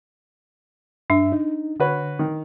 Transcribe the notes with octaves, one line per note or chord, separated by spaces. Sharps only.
G2 D4 E5
D#4
D3 F#4 B4 C#5
D#3